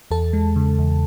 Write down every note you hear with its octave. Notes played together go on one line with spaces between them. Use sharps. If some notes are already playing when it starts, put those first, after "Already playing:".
E2 A4 A5
G#3
C#3
E2